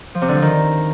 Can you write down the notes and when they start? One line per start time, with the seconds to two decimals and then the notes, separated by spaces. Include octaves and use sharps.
0.15 F3
0.22 C3
0.28 D3
0.35 F3
0.42 D#3